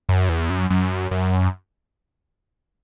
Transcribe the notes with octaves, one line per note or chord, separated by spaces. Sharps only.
F#2
E2
F#2
F#2
F#2